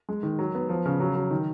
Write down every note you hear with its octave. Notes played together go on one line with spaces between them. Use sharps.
G#3
D#3
F#3
B3
F3
C#3
F#3
F#3
D#3